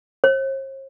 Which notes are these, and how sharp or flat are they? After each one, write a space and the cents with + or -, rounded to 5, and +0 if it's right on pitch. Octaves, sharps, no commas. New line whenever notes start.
C5 +45